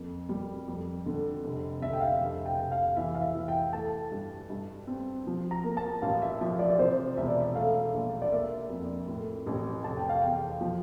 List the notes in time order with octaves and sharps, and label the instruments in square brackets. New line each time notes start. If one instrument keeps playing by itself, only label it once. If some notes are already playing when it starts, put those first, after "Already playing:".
Already playing: [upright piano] F2 A#3
G3
F2
D3
F1
[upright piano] D3 [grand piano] E5
[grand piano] G5
F5
[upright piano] F1
[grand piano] G5
[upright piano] F1
[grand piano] F5
[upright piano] E3 [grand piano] E5
[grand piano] F5
E5
[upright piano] E3
[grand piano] G5
[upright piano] A3 [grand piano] A5
[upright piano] G2
G2
C4
F3
[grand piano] A#5
[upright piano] A#3
[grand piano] A5
[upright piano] A1 [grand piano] F5
[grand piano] E5
[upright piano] F3 [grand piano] E5
[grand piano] D5
D5
[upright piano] C3 [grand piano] C5
[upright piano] E1 [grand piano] E5
[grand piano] D5
E5
[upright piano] A3 [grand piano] F5
[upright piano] A#1
[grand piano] D5
[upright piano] A#3 [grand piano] E5
[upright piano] F2
A2
A1
[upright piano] F1 [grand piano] A5
[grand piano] G5
F5
[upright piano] E2 [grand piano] G5
[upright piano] F3